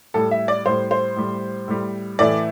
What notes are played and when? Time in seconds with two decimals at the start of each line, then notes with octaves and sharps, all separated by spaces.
0.14 A2 G3 A4
0.31 E5
0.48 D5
0.65 A2 G3 C5
0.91 C5
1.16 A2 G3
1.68 A2 G3
2.19 A2 E3 A3 D5